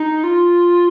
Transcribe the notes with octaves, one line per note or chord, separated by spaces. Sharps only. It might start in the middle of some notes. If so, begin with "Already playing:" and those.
Already playing: D#4
F4